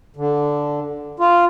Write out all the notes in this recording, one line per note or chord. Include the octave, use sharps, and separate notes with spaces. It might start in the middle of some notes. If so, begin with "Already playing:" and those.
D3
F4